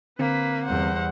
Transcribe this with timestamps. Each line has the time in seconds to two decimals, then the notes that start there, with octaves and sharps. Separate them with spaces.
0.19 D3 A#3 C4 B4 B6
0.64 E2 G3 C5 F#5